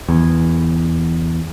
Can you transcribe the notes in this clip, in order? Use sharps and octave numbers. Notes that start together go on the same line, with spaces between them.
E2